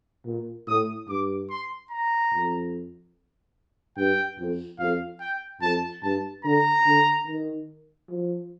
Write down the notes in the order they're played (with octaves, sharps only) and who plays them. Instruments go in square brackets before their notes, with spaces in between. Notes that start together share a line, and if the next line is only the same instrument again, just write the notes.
[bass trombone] A#2
[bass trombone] A2 [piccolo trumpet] D#6
[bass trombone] G2 [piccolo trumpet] D6
[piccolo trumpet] C6
A#5
[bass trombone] F2
[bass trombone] G2 [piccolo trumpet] G5
[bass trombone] F2
[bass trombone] F2 [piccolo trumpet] F5
[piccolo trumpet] G5
[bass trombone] F2 [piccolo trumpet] A5
[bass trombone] G2 [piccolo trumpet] A5
[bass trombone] D3 [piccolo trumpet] A#5
[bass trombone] D3
D#3
F3